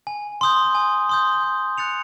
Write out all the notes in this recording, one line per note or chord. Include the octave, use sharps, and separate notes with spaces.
G#5
C6 D#6 G6
G#5
C6 D#6 G6
D#6
F#6 A6 C#7 F7